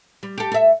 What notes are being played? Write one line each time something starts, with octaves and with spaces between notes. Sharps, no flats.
G3
G4 A4
A4 E5